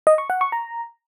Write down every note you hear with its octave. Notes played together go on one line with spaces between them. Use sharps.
D#5
C#6
F#5
C#6
A#5